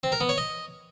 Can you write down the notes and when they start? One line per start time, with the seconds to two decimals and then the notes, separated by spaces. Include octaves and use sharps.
0.04 C4
0.12 A#4
0.21 B3
0.29 C#5
0.38 D#5